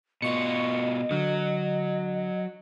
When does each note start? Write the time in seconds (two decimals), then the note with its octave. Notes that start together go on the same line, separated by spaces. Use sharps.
0.22 B2 F4 D#5 C#6 C#7
1.11 D3 F#3